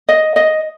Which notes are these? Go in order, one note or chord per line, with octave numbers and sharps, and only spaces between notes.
D#5
D#5